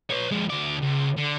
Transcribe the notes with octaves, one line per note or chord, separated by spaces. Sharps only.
B4 C#5
F2 G#3
D2 D5
C#2
D3